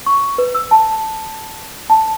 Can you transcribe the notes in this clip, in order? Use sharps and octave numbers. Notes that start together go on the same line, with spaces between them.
C#6
B4
E6
A5
A5